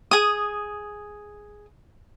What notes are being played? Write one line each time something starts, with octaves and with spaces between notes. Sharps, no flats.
G#4 D#6